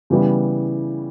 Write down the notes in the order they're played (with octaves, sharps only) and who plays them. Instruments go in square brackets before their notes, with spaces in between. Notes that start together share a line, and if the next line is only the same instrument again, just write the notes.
[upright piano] C#3 E3 G3 B3 E4